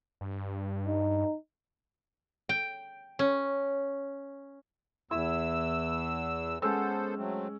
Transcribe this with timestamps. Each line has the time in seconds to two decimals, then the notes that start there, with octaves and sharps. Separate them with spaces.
0.21 G2
0.87 D#4
2.49 G5
3.19 C#4
5.11 E2 E4 E6
6.62 G#3 B3 C#4 A4 C5 E6
7.17 F#3 A3 C4